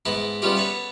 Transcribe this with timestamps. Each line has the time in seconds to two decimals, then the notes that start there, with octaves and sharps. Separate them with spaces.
0.05 G#2 B3 E4 A5 B5
0.42 G3 B3 C#4 E4 F4 G4
0.56 B3 A4 B4 C#5